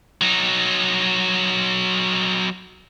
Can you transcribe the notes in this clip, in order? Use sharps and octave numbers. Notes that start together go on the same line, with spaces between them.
F#3 D#4